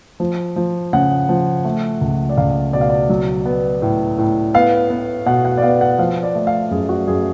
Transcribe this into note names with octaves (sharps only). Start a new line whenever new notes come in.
F3
F3
C#3 F#5
F3
A3
C#2
D5
C#2 F5
B2 D5
F5
D5
F#3
B3
A2
A2
B3 F5
B3
B2 F#5
F#5
D5
B3 F5
F#5
F3 F5
D5
A3
F5
F#2 G#4
F#4
F#2 G#4